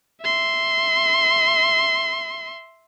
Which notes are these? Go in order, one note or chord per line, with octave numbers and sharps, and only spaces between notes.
E5 C6